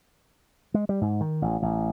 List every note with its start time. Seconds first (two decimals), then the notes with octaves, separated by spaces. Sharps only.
0.74 G#3
0.89 G3
1.01 G#2
1.21 D#3
1.42 A1
1.62 A1